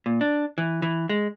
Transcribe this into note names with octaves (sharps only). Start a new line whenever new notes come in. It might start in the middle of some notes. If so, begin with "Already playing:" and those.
A#2
D4
E3
E3
G#3